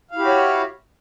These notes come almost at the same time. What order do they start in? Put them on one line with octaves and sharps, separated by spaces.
F5 E4 G4 F#4 C#5